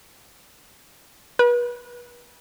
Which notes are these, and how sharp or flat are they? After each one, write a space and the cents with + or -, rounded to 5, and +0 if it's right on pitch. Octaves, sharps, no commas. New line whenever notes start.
B4 -35